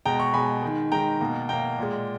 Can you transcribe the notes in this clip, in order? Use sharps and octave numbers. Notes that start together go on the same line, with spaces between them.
B2 G#3 G5 A#5
A#5 C#6
B2 G#3 G#5 B5
D#3 G#3
D#3 G#3 G5 A#5
B2 A#3
B2 A#3 G5 A#5
A#2 G#3